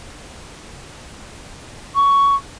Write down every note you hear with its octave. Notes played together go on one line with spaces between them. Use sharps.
C#6